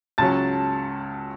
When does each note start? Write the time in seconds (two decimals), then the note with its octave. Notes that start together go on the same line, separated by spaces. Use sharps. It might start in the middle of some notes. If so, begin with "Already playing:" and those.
0.18 C#2 C#3 F#3 C#4 A5 A6